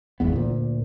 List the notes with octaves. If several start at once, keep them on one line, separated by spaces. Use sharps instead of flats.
D1 G#1 E2 B3
D2 A#2